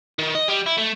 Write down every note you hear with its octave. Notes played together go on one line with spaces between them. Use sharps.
D#3
D#5
G3
E4
A3